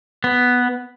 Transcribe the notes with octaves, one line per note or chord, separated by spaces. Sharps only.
B3